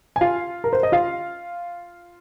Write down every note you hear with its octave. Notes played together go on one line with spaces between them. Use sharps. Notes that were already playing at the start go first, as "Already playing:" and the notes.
G#5
F4 F5
A#4
C5
D#5
F4 F5